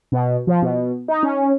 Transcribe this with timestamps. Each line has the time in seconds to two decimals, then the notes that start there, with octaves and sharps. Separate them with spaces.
0.12 B2
0.47 F3
0.62 B2
1.08 D#4
1.23 C#4